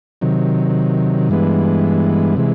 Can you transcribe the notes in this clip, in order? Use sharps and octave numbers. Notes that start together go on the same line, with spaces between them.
C3 D#3 F#3
G2 E3 G#3 B3
C3 E3 G#3